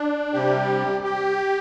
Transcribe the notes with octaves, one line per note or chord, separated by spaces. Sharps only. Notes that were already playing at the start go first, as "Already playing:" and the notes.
Already playing: D4
C3 G3 G4
G4